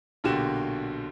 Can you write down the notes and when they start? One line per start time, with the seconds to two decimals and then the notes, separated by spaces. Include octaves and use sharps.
0.24 B1 A#2 D3 F#4 G4 E7